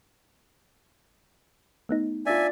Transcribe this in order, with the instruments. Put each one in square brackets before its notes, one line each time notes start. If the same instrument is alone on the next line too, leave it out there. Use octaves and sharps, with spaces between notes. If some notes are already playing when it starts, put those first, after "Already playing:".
[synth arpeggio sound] A3 B3 D#4
[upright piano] D4 F4 [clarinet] D5 [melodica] E5 G#5